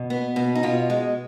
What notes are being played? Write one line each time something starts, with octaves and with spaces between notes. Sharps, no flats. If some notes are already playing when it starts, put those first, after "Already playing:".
Already playing: B2
B3
B2
D#4
B2 F4
G#3